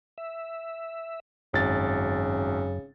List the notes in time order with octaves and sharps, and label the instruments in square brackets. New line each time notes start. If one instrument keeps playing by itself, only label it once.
[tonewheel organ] E5
[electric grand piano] G#1 A6 [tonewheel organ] F#2 [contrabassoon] C#3